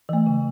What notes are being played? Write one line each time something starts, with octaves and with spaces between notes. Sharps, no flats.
E3 A3
C#3